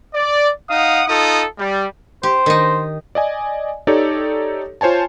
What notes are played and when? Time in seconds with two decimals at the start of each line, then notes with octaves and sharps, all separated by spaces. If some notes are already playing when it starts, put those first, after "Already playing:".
0.14 D5
0.70 D#4 F5 F#5 D#6
1.09 D#4 F4 A4 D#6
1.58 G3
2.23 G4 C5
2.46 D#3 D#4
3.15 D5 D#5 G#5
3.87 D#4 G4 A4 C#5 D5
4.81 F4 C5 C#5 G#5 A5